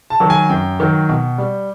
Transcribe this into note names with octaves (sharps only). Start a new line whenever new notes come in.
A5
D#3 F#3
G#5
F#2 G5
D#3 F#3
B2
G3